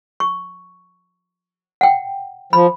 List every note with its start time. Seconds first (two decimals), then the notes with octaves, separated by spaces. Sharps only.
0.20 C#6
1.81 F#5 G5
2.53 F3 B5